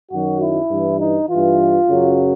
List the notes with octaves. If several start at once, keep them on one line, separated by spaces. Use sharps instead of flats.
F#2 D#3 F#3 F#4
E4
G2 E3
D#4
G2 E3 F4
F#2 C#3 F#3